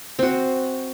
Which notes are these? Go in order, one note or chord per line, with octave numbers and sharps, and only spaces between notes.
C4 F#4